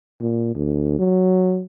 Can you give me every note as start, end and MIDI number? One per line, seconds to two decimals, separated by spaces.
0.21 0.51 46
0.55 0.96 38
0.99 1.63 54